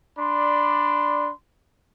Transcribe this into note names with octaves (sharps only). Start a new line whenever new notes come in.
D4 D5 B5 C6